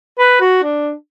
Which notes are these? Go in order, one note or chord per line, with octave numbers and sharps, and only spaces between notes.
B4
F#4
D4